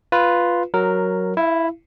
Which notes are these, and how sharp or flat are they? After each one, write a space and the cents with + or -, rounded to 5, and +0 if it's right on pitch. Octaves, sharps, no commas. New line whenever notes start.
F4 +0 B4 +0
F#3 +0 A#4 +0
E4 +0 F5 -40